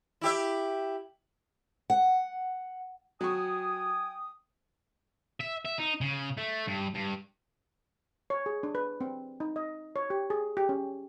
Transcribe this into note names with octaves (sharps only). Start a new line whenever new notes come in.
E4 G4 E5
F#5
F#3 G5 G#5 C#6 D#6
E5
E5
D#4
C#3
A3
G2
G2
C#5
G#4
D4
B4
C4
D#4
D#5
C#5
G4
G#4
G4
C#4